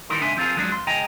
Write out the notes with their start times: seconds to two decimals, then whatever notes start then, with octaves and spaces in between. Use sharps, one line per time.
0.09 D#3 E3 G3 D#4 A#4 C6
0.22 C#2 D4 E5 G#5 C6
0.37 F3 C4 F4 G#4 A#4
0.57 F3 F#3 G#3 D4
0.71 F2 C6
0.87 C#2 G#4 D#5 G5 G#5 A#5